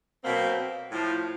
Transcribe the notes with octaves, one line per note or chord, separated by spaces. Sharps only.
B2 F#3 A#3 C4
A2 F3